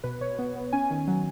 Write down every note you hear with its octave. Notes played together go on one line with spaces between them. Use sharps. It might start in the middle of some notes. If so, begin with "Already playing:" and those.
B2 B4
B2 C#5
B3
B3
C#4 G#5
D#3
F#3